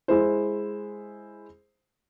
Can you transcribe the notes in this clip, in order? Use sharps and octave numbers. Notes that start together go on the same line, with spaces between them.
G#3 E4 C5